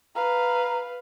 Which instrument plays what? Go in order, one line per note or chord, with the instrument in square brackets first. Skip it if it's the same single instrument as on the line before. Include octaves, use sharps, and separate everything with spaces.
[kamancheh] B4 F5 [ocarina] A#5